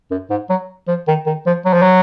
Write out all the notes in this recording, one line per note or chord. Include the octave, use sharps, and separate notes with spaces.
F#2
G#2
F#3
F3
D#3
D#3
F3
F#3
F3
F#3